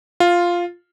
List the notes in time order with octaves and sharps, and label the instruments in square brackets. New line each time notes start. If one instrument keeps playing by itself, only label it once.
[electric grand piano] F4